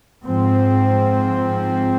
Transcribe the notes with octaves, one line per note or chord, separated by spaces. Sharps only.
G#2 F3 C4